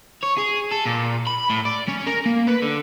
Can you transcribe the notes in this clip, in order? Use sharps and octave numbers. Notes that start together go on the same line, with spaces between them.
C#5
G#4
A4
A#2
B5
A2
D5
C#4
A#4
A#3
B4
D3